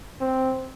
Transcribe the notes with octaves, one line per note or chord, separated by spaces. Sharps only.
C4